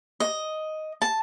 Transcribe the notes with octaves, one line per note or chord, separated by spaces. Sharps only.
D#5
A5